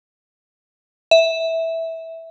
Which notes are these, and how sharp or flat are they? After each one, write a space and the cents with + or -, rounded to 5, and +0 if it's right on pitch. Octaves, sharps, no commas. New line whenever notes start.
E5 -10